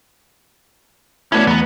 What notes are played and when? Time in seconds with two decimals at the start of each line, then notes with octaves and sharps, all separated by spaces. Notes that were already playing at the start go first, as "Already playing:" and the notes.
1.32 E3 A3 B3 C#4 D4 E4 F#4
1.47 E2 B3 A#5